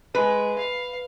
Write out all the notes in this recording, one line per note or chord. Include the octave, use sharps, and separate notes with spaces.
G#3 B4
F5